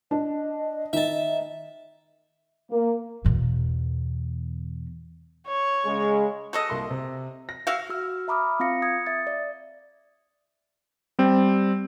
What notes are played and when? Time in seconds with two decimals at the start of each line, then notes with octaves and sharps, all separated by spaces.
0.11 D4 D#5
0.93 D#3 E5 A5
2.71 A#3
3.25 E2 B2
5.47 C#5
5.86 C#3 G#3
6.53 F#4 A4 D#5
6.70 C2 A#3 C6
6.90 C3
7.49 A#6
7.67 F#4 E5 F5
7.89 F#4 E6 F6
8.28 E5 A#5 B5 D6 D#6 F6
8.60 C4 F4 F5 A#6 C#7
8.82 D#6 G#6 C#7
9.07 E5 A6
9.27 D5
11.19 G3 C4